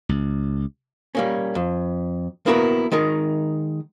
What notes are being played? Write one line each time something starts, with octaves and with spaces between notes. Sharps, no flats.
C#2
G3 A#3 C#4
F2
A#3 B3 E4 F#4 A4 A#4
D#3 G#3 D#4 A#4